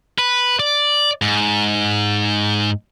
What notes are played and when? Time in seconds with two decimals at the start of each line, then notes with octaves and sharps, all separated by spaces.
0.18 B4
0.60 D5
1.22 G#2